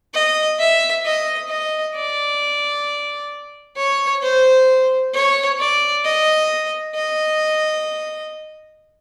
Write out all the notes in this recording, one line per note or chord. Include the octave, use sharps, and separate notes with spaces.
D#5
E5
D#5
D#5
D5
C#5
C5
C#5
D5
D#5
D#5